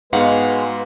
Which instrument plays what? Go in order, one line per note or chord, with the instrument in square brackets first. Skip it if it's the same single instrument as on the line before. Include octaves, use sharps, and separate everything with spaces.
[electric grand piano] G#2 B3 [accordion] G#3 [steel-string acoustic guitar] F#4 F5 F#5 [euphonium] B4